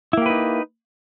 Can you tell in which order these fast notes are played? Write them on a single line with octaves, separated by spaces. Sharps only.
E4 A#3 G4 B4 D#4